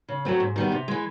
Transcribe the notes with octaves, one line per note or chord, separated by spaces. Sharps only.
C#3
F#3 A3 C4
G#2
D#3 G3 B3
C3
E3 G#3